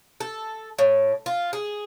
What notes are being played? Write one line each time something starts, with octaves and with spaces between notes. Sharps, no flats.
A4
A2
F4
G#4